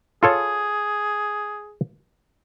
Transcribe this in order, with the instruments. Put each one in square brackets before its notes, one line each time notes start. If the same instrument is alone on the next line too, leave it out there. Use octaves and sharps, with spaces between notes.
[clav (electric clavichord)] F4 A4 C#5 [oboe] G#4